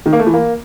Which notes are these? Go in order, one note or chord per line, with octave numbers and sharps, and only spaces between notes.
D#3
A#3
A3
E3
A#3